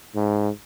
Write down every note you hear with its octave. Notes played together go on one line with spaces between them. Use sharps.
G#2